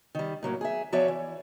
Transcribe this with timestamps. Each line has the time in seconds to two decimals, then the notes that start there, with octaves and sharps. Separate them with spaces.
0.15 D#3 G3
0.43 A2 F#3 A#3
0.61 G#4 E5
0.92 E2 F3 F#4 C#5 D5 E5
1.08 E3